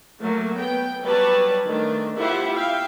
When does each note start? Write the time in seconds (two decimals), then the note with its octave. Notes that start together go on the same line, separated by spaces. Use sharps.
0.22 F#3 A3 A#3
0.56 B3 G5
1.04 F#3 G3 B4 C#5 D5 A5
1.64 D#3 A3 D4
2.18 E4 F4 G4 C5 E5 F#5
2.54 E5 F5 G5